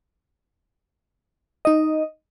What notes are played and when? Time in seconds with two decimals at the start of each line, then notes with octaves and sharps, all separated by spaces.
1.65 D#4 D#5